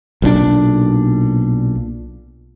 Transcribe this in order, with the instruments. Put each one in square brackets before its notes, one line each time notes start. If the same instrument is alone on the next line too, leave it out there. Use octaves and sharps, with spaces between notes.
[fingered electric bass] B1 A#2 C#4 D4